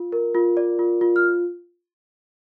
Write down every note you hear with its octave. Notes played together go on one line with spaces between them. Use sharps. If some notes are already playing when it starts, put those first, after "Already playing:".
Already playing: F4
A#4
F4
D5
F4
F4
F6